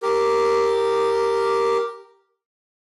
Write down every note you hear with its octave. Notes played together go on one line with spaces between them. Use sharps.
G4 A#4